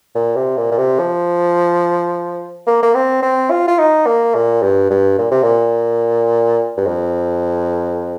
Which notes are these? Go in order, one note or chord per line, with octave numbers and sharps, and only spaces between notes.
A#2
C3
A#2
A#2
C3
F3
A#3
A#3
C4
C4
F4
F4
D#4
A#3
A#2
G2
G2
A#2
C3
A#2
G2
F2